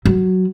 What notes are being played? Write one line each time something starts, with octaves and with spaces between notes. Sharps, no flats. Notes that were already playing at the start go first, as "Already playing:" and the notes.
F#3